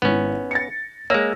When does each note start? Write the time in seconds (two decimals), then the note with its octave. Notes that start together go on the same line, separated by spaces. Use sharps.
0.02 G#1 B3 C#4 E4
0.51 A6 A#6 C#7
1.10 G#3 A#3 C#5 E6 A#6